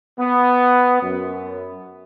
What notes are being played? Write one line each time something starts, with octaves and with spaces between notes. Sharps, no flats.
B3
F#2